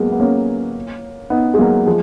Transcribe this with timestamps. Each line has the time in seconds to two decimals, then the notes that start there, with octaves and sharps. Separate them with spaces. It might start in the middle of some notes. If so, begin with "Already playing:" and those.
Already playing: F#3 G#3 A#3 B3
0.12 B3
0.20 A#3 C#4
1.30 B3 D#4
1.54 G#3
1.59 F#3 A#3
1.86 F3 G#3